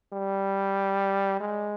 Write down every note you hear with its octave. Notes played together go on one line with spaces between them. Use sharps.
G3
G#3